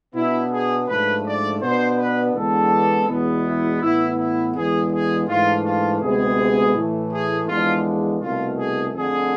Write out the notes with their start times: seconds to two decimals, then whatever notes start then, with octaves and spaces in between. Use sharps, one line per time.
0.14 B2 B3 D4 E4
0.51 G#4
0.88 G#2 F3 A3 D4 B4
1.25 D5
1.61 B2 B3 D4 C5
1.97 B4
2.34 E2 D3 G#3 B3 D4 A4
3.07 E2 B2 G#3 B3
3.45 E4
3.81 A2 E3 B3 E4
4.17 E4
4.54 E2 D3 G#3 G#4
4.91 G#4
5.28 G#2 E3 A3 D4 F4
5.65 F4
6.01 D2 C3 G#3 B3 G#4
6.75 A2 E3 A3
7.11 G#4
7.47 E2 D3 F3 G#3 D4 F4
8.20 C2 B2 A3 F4
8.57 G#4
8.94 F2 D3 A3 G#4